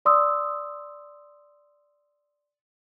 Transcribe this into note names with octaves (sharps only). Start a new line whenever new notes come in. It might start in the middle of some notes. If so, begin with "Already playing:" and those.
D5 C6 D#6 E6